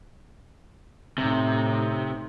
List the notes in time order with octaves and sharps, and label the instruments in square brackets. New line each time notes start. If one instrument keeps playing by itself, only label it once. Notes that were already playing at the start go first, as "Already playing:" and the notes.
[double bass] A2 D#4 [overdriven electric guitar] C3